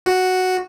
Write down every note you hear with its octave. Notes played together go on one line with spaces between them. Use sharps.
F#4